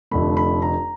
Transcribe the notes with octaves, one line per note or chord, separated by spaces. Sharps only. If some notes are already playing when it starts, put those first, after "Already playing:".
F1 F2 D3 F3 A3 B5
B5
A#5